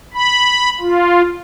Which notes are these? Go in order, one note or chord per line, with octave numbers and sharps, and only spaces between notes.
B5
F4